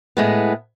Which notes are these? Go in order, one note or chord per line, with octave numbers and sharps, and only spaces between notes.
A2 G#3 B3